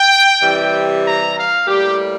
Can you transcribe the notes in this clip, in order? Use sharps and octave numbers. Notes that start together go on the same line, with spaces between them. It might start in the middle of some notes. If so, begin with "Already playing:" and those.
Already playing: G5
C3 E3 G3
A#5
F5
A2 G3 A#3 G4